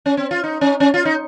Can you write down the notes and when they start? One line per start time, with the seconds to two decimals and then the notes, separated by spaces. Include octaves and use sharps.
0.06 C#4
0.17 C4
0.31 F4
0.44 D#4
0.61 C#4
0.80 C#4
0.94 F4
1.05 D#4